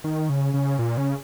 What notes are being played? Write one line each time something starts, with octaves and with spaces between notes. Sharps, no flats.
D#3
C#3
C#3
A#2
C#3